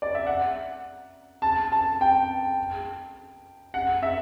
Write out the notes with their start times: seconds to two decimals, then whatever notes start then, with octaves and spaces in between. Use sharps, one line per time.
0.02 D5
0.15 E5
0.27 F#5
1.42 A5
1.72 A5
2.01 G5
3.74 F#5
4.03 E5